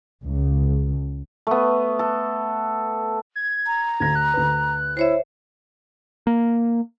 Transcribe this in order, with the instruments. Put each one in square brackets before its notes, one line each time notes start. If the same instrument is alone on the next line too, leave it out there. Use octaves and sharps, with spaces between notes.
[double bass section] C#2
[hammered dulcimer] A3 B3
A4
[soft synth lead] G#6
[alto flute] A#5
[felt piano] D2 A#6 [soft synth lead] G#6
[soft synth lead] F#6
[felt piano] D2 B4
[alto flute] E4 [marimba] C5 C#5 E5
[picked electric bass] A#3